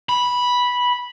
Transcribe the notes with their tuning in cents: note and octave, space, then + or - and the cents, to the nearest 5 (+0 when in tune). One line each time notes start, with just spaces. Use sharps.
B5 -10